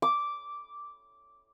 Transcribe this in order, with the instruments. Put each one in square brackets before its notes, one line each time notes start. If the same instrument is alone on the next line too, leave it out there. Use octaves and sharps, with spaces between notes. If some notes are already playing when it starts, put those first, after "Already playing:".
[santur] D6